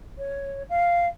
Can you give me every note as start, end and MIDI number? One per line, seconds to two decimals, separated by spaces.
0.18 0.63 73
0.69 1.08 77